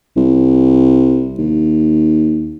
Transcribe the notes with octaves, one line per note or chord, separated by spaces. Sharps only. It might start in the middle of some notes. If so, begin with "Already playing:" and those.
C2
D#2